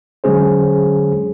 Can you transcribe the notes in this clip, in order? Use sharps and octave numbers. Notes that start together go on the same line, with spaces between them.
D3 F#3 G#3 C#4 G#4 C5